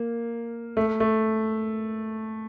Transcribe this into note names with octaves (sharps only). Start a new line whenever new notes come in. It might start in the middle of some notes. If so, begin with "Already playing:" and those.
Already playing: A#3
A3
A3